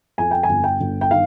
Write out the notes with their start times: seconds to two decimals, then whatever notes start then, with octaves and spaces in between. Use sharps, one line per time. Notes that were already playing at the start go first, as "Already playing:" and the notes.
0.18 F2 G#5
0.31 G5
0.43 G#5
0.49 G1
0.64 G5
0.80 G1
1.01 G5
1.11 D#3 F5